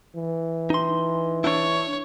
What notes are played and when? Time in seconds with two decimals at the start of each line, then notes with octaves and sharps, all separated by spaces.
0.15 E3
0.70 D#4 C6
1.44 D4 E4 C#5